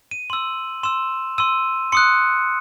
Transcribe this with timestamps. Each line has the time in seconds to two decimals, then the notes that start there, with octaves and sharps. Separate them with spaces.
0.11 D#7
0.30 C6 E6 F#7
0.83 C6 E6 E7
1.38 C6 E6 D#7
1.92 C6 D#6 F#6 C#7